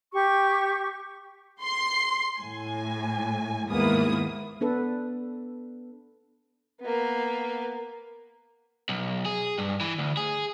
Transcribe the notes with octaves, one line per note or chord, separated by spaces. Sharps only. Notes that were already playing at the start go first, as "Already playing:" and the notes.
G4 C#6
C6 C7
A2 G#5
D#2 G#2 A#3 B3 E4 D#6
B3 D4 A4 B4
A#3 B3
B1
G#4
G2
E3
D2
G#4